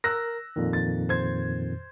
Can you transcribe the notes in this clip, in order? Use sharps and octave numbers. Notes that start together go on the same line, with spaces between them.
A#4 E6 F#6 A#6
F2 A#2 D#3
A6
C5 G#6